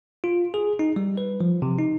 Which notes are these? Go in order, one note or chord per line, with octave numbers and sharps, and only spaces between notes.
F4
G#4
D#4
G3
B4
F3
C3
D#4